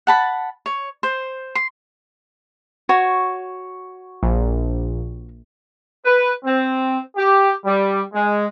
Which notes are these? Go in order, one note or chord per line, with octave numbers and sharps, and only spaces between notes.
F#5 A5 B5
C#5
C5
C6
F#4 C#5
A#1
B4
C4
G4
G3
G#3